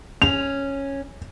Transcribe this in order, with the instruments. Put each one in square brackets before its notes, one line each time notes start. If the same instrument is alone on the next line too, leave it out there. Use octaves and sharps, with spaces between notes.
[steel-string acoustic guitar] C#4 [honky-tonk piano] F7